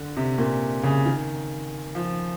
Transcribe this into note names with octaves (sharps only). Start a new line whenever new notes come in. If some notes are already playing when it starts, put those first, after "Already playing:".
Already playing: D3
C3
A#2
C#3
D#3
F3